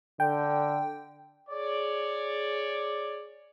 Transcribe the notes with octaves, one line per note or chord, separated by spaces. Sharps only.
D3 G5
G#4 C#5 D5